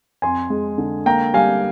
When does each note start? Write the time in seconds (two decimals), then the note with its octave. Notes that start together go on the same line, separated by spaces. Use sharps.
0.22 F2 G#5 C6
0.50 G#3
0.78 D3
1.06 A#3 G5 A#5
1.34 G3 F5 G#5